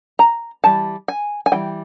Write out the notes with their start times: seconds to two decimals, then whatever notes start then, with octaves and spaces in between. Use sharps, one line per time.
0.19 A#5
0.64 E3 G3 A5
1.08 G#5
1.46 G#5
1.52 E3 G3 G5